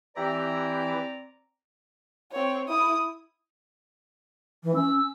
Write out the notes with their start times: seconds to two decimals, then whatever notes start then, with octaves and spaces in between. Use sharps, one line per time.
0.16 E3 C4 E4 G4 D5 A#5
2.32 C4 C#5
2.68 E4 D#6
4.63 E3
4.75 C#4 E6